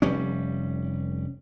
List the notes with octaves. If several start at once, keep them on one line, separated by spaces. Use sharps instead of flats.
F1 G3 C#4